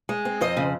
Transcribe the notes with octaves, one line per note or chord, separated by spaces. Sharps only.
G#3
C4
F2 C5 D#5
C#3